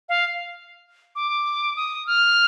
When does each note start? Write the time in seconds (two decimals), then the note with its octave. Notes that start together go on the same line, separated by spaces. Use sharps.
0.09 F5
1.16 D6
1.76 D#6
2.07 F6